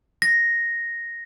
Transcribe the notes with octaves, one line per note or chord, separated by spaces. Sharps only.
A#6